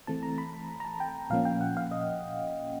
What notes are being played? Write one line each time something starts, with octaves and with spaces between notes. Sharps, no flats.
E3 A3 C4 A5
A#5
B5
B5
A#5
A5
G5
A#2 F3 A#3 C#4 F5
G5
F#5
F5
D#5